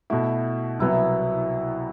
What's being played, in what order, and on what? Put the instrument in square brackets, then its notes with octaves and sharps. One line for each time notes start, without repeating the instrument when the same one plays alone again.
[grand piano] B2 A3 E4 [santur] F#4
[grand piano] C2 B2 F#3 B3 [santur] E4